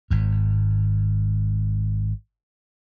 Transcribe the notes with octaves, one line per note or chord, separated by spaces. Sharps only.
G#1 G#2